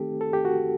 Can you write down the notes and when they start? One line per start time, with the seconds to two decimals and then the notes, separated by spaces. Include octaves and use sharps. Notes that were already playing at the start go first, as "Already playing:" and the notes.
Already playing: D#3 A3 C4 D#4 G4 A4
0.21 A4
0.33 G4
0.45 F#4